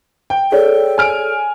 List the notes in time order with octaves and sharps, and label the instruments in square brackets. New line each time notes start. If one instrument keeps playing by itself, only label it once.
[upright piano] G5
[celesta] G#4 C#5 D5 [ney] A4
[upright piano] G#5 F6 D7